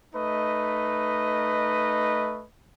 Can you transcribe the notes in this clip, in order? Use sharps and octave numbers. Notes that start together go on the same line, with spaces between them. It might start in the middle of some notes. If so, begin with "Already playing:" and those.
A3 D#4 B4 D#5